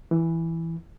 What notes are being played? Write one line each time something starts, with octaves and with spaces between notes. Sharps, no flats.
E3